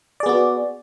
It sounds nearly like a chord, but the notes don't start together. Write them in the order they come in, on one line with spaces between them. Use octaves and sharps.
D5 G#4 B3 F#4